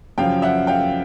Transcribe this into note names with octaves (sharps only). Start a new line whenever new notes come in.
F#2 C#3 F3 F5 G5
E5 F#5
F5 G5